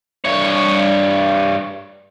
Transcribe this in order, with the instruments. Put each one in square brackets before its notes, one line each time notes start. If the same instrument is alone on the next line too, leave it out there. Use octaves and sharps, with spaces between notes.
[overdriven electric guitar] G2 C#5